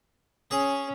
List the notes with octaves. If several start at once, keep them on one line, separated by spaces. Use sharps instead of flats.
C#4 G#4